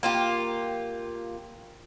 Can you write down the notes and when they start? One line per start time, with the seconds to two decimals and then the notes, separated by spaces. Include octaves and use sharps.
0.03 A#3 F4 G4